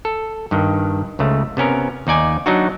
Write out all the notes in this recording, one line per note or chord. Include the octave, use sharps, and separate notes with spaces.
A4
G2 D#3
C#2 C#3 A3
C3 B3 C#4 A#4
D#2 D#4 D5 G#5
F#3 D4 D#4 F#4